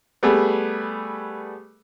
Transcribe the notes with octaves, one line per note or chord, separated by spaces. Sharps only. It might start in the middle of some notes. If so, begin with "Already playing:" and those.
G3 A3 B3 G#4